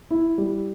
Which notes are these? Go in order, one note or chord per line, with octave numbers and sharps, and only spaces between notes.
E4
G3